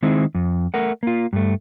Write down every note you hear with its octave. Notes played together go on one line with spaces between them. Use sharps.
D#3 G#3 C4 E4
F2
A3 A#4 F#5
A#3 F4
G2 A3